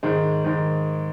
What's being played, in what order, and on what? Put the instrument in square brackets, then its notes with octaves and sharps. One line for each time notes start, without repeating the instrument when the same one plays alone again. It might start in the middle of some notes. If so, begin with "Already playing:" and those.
[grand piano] G#2 D#3 G#3
G#2 D#3 G#3